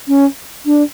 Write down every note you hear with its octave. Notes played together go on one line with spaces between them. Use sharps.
C#4
D4